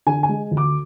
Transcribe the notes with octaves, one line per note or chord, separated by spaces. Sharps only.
D3 G#5
G#5
G#3
D2
D6